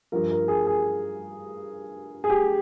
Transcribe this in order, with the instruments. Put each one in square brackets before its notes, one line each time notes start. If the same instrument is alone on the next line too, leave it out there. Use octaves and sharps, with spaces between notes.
[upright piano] G2 F3 A#4
A#4
G#4
G#4
G#4
G4